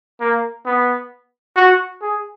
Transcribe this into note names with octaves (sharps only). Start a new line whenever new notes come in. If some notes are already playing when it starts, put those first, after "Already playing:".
A#3
B3
F#4
G#4